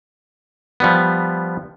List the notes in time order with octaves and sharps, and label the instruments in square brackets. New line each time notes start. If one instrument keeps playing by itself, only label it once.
[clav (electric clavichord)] F3 G3 B3